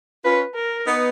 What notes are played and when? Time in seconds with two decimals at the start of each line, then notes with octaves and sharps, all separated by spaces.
0.24 C#4 F4 B4
0.54 A#4
0.85 B3 D#4